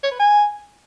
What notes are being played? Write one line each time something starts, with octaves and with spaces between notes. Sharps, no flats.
C#5
B4
G#5